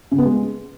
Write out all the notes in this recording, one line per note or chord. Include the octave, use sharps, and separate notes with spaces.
C#3
B3
G#3